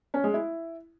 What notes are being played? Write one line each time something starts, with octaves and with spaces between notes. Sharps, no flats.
C#4
G#3
E4